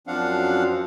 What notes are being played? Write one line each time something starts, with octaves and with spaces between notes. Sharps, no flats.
F#2 F3 C4 D4 F5 F#5